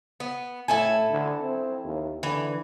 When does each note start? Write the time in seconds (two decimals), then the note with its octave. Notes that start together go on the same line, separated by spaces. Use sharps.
0.20 B3
0.68 A2 E4 A4 G#5
1.11 D3
1.41 C4
1.84 D#2
2.23 D3 E3